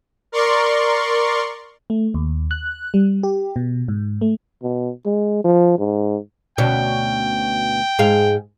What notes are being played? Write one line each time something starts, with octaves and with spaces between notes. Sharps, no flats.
A#4 D5 C6 C#6
A3
D#2
F#6
G3
G4
B2
G#2
A3
B2
G#3
F3
G#2
D2 B2 C#4 G5
G#2 G#4 F5